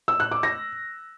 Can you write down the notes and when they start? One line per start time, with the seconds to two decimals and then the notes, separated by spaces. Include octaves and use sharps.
0.08 E6
0.20 F#6
0.31 D6
0.43 A#6